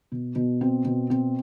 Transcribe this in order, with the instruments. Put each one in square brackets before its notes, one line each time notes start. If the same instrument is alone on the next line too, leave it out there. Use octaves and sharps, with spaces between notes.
[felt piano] B2
B2
C4
B2
C4